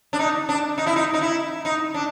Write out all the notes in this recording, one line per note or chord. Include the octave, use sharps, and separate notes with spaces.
D4
D#4
D4
D#4
E4
D#4
D#4
E4
D#4
D4